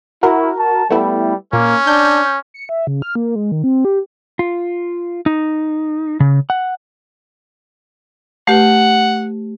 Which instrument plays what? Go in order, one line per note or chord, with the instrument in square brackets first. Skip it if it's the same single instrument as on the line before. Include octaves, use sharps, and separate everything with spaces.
[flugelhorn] E4 [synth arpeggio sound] F#4 A#4
[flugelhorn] A5
[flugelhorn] G3 [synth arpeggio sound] A3 B3 E4
[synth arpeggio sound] A#2 [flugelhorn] A#3 [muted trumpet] C#4
[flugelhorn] D4 [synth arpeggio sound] G6
[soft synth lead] C#7
E5
C#3
F6
A#3
G#3
D#3
C4
G4
[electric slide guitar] F4
D#4
C#3
F#5
[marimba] A3 G4 B4 [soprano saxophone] F#5